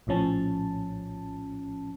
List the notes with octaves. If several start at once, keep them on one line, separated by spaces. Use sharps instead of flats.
A#1 A2 F3 C#4 A5